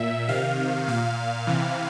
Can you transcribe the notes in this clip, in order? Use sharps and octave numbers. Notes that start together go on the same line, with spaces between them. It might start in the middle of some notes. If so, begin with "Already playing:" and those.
Already playing: A#2 E5
C3 D#3 F5
A#2 F5
C3 E3